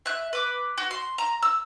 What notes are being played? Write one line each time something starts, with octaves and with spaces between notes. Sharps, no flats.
E5 F#6
B4 D6
F#4
C6
A#5
E6